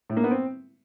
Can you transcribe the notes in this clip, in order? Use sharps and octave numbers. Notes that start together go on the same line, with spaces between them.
A2
A#3
B3
C4